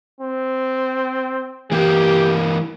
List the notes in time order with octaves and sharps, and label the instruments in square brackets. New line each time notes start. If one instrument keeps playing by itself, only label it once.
[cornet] C4
[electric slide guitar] E3 A#3 [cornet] G4